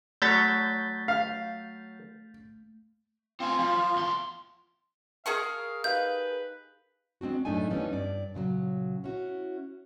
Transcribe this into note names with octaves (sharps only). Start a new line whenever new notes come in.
F#3 A3 A4 C#5 G6 A6 B6
F5
C4 F4 G#5
F3 F4
E2 C6
G#4 A#4 F5 C#6
D#4 G4 B4 F5 G6
G#3 C4 D4 F#4
F#2 A2 A3 D4 D#4 G#5
E3 F3 G3 B3 C#4 D#4
G2 D5
A#2 C#3 E3 F#3
C#4 E4 F#4